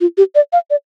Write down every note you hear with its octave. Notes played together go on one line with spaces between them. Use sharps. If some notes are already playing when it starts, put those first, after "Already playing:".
F4
G4
D5
F5
D5